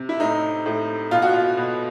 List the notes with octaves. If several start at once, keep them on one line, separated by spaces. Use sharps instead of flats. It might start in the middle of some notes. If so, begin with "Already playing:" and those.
Already playing: C3
E4
A2 D#4
A2
B2 F4
F#4
F4
B2